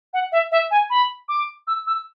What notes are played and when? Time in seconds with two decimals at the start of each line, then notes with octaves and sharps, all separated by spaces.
0.14 F#5
0.32 E5
0.52 E5
0.71 G#5
0.90 B5
1.29 D6
1.67 E6
1.87 E6